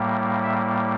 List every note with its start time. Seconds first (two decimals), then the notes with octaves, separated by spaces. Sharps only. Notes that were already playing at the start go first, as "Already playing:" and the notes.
Already playing: A2 G3 A#3
0.43 E5